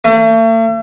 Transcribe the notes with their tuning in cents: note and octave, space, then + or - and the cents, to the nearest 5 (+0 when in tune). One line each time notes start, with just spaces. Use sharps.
A3 +40